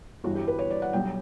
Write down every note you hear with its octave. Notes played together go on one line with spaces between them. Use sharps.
G1 G2 E3 G3 F#4
G4
B4
C#5
D5
F#5
B1 B2 G3 G5